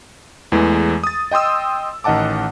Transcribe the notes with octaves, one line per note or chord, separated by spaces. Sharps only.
E2 E3 G#3 A3
D#6 A6
D#5 G5 C6 D#6 E6
A1 D#3 D#5 F#5 A5 D6